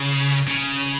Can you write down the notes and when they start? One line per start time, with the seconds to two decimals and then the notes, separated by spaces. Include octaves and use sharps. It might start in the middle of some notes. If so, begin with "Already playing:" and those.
Already playing: C#3
0.47 C#3